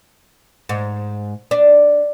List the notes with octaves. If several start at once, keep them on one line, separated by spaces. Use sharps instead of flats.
G#2
D4